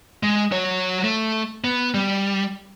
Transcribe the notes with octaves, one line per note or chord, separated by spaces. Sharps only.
G#3
F#3 C#5
A3
B3
G3